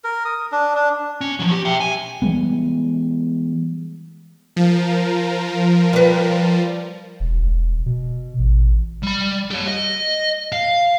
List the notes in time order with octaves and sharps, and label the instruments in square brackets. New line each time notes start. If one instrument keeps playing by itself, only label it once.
[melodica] A#4
D#6
D4
D4
[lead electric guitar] C#4
F3 F#3
G4
E5 G5
G#5
[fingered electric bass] E3 G3 G#3 B3
[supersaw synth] F3 [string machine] A#4
[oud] G3 B4
[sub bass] E1
E1
B2
A1
[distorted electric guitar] G3 B5
G4 C#5
D#5
F5